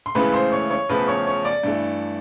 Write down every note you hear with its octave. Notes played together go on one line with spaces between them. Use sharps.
C6
C#2 C#3 E3 A3 B4 B5
C5 C6
C#5 C#6
C#5 C#6
E2 C#3 F3 A3 B4 B5
C#5 C#6
C#5 C#6
D5 D6
G2 E3 A3